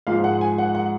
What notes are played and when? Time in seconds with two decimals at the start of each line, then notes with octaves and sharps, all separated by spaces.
0.07 G#2 F3 G#3 F5
0.24 F#5
0.41 G#5
0.58 F#5
0.75 F#5